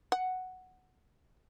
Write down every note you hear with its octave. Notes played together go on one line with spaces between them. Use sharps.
F#5